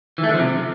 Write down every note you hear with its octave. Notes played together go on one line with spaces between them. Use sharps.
E3
A3
D3
F3
C3